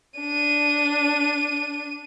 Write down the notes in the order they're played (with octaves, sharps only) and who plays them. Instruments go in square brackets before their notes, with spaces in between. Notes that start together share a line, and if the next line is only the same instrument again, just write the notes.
[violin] D4 D#7